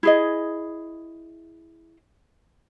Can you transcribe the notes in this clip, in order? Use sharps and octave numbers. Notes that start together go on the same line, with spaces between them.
E4 G#4 D#5